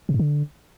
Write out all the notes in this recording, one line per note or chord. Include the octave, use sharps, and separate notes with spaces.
C3
G#2
D3